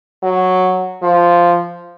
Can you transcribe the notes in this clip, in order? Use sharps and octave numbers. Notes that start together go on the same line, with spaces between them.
F#3
F3